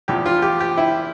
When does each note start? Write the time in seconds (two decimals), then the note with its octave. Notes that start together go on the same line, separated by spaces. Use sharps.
0.08 E2 C3 F3 G4
0.26 F4
0.42 G4
0.60 G4
0.77 E4